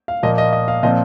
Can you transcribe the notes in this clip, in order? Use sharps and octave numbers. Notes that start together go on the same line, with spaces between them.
F5
A#2 F3 A#3 D#5
D#5
D#5
F5
A#2 F3 C4 D#5